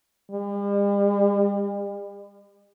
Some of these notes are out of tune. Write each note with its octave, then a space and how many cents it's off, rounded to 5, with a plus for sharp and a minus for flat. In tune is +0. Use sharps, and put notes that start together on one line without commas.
G3 +45